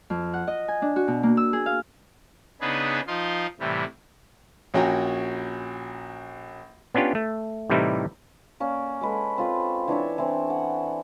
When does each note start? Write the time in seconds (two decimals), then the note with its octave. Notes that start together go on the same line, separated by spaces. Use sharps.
0.10 F2
0.34 F#5
0.47 D#5
0.68 G#5
0.82 D4
0.96 F#4
1.08 B2
1.23 A#3
1.37 E6
1.53 G#4
1.66 F5
2.61 C#3 B3 D4 D#4 G#4 B4
3.07 F3 D#4 F4 D#5 C6
3.60 A2 C3 E3 G3
4.74 A#1 C#4 F#4 G5 G#5 A#5
6.95 B3 C#4 D4 F4 G4
7.15 A3
7.70 A2 C3 E3 G3 D#4 E4
8.60 A#3 C#4 D5
9.01 G#3 A4 B4
9.38 C4 F4 B4
9.88 E3 D4 C#5 E5
10.18 E3 C4
10.50 F#5